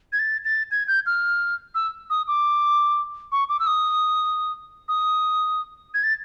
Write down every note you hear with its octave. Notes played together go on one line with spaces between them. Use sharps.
G#6
A6
A6
G#6
G6
F6
E6
D#6
D6
C#6
D6
E6
D#6
D#6
G#6
A6